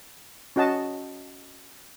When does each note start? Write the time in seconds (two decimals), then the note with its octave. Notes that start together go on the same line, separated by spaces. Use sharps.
0.56 C#4 F#4 D#5 A5